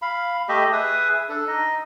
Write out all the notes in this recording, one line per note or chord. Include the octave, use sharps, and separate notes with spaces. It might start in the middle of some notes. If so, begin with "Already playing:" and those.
F5 B5
A3 G4 D#5 E5
G#4 B4 E5 D#6
D4 A4
D#4 D#5